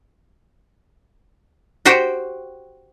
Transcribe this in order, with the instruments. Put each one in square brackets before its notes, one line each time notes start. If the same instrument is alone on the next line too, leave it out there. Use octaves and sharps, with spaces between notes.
[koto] F#4 G4 C5 G5